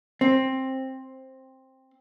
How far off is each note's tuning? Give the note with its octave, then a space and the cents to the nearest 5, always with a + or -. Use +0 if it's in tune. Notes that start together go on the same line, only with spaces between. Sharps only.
C4 +10